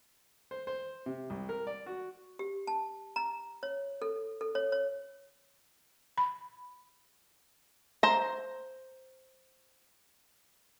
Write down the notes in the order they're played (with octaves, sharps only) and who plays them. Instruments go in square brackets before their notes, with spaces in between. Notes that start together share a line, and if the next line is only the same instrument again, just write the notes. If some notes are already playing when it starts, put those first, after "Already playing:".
[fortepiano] C5
C5
C3
C2
A#4
D5
F#4
[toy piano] G4
A5
A#5
C#5
A4
A4
C#5
C#5
[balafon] B5
[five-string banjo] C5 A#5